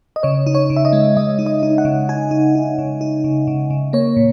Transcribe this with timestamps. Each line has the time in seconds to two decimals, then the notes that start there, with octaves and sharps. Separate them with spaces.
0.16 D#5
0.23 C#3 C#5
0.47 D#4
0.55 C#5
0.70 C#3
0.76 E5
0.85 D#5
0.93 G#3
1.17 G#3 D#5
1.39 D#4
1.46 D#5
1.63 D#4
1.78 F#5
1.85 C#3
2.09 D#4 G#5
2.31 D#4
2.55 D#4
2.78 C#3
3.01 D#4
3.24 C#3
3.48 C#3
3.70 C#3
3.93 A#3 C#5
4.17 A#2